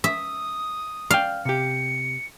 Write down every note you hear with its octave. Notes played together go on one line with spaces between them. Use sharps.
E5 D#6
D5 F5 G5
C3 G4 C#7